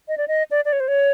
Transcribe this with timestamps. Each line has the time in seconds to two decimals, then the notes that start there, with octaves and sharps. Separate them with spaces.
0.08 D#5
0.18 D5
0.28 D#5
0.51 D5
0.65 D5
0.73 C#5
0.80 C5
0.88 C#5